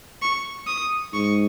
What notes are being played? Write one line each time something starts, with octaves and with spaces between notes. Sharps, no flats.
C#6
D#6
G#2 C#6